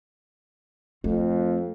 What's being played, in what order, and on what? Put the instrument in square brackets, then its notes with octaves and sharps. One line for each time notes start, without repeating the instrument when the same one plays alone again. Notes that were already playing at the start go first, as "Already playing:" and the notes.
[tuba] F2 [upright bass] A3 C4